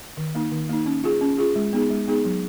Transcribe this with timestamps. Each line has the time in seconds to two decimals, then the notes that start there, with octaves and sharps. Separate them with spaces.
0.17 D#3
0.35 A#3 D#4
0.52 D#3
0.69 A#3 D#4
0.86 C#4
1.04 F4 G#4
1.21 C#4
1.38 F4 G#4
1.56 G#3
1.73 B3 D#4 G#4
1.90 G#3
2.08 B3 D#4 G#4
2.25 F#3